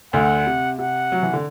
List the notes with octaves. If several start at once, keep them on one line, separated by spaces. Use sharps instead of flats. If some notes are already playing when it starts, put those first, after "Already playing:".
D2 D3 F#5
C3
C3 F#5
F#3
E3
D3